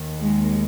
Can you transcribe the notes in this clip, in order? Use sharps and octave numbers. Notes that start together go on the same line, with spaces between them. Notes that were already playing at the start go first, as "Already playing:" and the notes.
Already playing: D#2 D#3
G#3